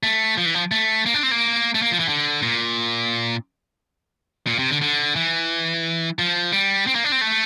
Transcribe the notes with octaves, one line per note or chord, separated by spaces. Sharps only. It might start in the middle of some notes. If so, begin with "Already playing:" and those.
A3
F3
E3
F3
A3
A#3
D4
C4
A#3
A3
A#3
F3
E3
D3
A#2
A#2
C3
D3
D3
E3
F3
G3
C4
A#3
D4
C4
A3